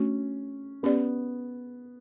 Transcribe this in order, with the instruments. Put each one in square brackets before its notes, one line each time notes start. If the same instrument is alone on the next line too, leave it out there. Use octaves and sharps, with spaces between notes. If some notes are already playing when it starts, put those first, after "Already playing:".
Already playing: [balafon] A3 D4 F#4 [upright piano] C#4
[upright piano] B3 [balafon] C#4 G4 B4 D5